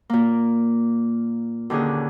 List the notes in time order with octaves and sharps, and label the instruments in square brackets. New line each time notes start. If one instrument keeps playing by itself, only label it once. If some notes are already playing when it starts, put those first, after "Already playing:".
[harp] A#2 A#3
D#2 D3 C#4 G#4